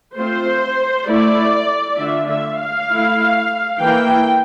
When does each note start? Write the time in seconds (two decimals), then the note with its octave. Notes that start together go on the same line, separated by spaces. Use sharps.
0.16 A3 C4 F4 C5
1.07 A3 E4 D5
1.98 D3 A3 D4 F4 E5
2.29 E5
2.59 F5
2.89 A3 E4
3.80 E3 A#3 E4 G5